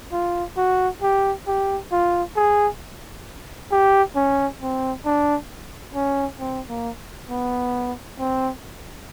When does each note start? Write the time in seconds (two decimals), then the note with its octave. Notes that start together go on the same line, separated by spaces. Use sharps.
0.12 F4
0.57 F#4
1.02 G4
1.47 G4
1.92 F4
2.36 G#4
3.71 G4
4.16 C#4
4.61 C4
5.05 D4
5.95 C#4
6.39 C4
6.69 A#3
7.30 B3
8.19 C4